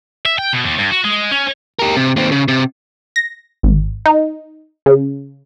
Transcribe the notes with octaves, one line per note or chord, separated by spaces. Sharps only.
E5
G5
B2
D#2
G2
F#4
G#3
C#4
G4 A#4
C3
D#2 C4
C#3
C3
A#6
G#1
D#4
C#3